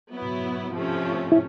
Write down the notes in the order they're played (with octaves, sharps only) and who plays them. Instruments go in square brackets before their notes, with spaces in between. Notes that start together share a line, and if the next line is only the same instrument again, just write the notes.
[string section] F#3 B3 E4
C3 F3 A3 C#4
[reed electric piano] E4